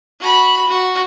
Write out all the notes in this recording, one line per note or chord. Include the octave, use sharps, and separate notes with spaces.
F#4 B5
F#4